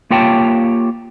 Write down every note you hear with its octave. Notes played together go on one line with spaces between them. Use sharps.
A#3 F4 G4 C#5 G5 A5